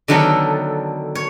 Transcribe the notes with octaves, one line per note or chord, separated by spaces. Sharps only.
D3 D#3 F#3 B3 A4
C#5